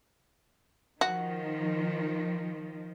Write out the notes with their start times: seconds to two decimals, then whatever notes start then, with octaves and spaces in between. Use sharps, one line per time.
1.01 D#3 F3 F#4